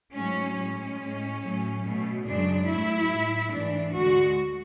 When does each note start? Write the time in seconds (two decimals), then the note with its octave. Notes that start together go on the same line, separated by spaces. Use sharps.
0.14 G#2 F#3 A3 C#4
0.56 A2 G#3 C#4
0.98 A2 G#3
1.41 A2 F#3 A3
1.83 B2 A3
2.25 F#2 C#3 G#3 D4
2.68 G#2 F#3 A3 E4
3.09 A2 G#3
3.52 G#2 E3 A3 D4
3.94 D2 D3 G#3 F#4